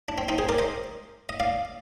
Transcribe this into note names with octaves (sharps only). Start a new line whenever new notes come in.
D4
C4
C4 D#4
G#4 C5
A#4 D5
C5 D#5
D#5
D5 F5